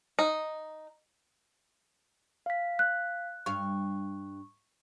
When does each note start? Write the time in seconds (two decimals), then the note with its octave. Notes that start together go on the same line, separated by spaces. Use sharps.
0.19 D#4
2.46 F5 B6
2.79 F#6
3.46 G2 F5 C#6